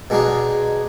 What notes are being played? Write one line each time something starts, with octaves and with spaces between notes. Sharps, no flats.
B2 G#3 D4 D#4 G#4